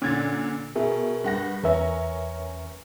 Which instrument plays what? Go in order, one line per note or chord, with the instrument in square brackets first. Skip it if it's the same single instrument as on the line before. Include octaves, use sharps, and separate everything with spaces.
[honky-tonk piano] A#2 D3 [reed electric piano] C#4 G#6 A6
[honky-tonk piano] B2 [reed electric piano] G#4 A#4 E5
[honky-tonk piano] G2 F#5 A#6
[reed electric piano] E2 B4 E5 [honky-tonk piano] C#4 A#4